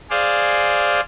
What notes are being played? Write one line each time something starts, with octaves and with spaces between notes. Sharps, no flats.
G#4 C5 D5 F5